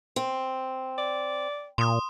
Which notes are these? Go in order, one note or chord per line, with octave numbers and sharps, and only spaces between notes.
C4
D5
A#2 C6 D#6